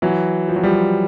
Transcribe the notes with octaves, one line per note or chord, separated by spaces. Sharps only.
E3 F#3
F3
F#3
F3 G3